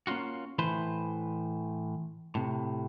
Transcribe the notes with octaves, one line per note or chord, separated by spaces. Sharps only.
A#3 C#4 D4 F4 F#4
A2 E3 B4 C5
A2 C3